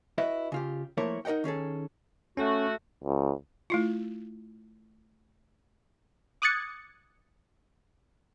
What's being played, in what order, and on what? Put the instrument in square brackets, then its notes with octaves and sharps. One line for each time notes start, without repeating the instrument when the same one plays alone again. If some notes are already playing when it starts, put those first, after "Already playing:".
[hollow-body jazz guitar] E4 F#4 B4 D#5 E5
C#3 F4 G4
F3 A3 A#3 E4 A#4 C#5
D#4 A#4 D#5 F#5 G5
D#3 C#4 G#4 A4
[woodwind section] A3 F#4 [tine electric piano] C#4 A4
[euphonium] C#2
[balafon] A3 E4 F4
[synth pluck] D6 D#6 F#6 G#6 A6 C#7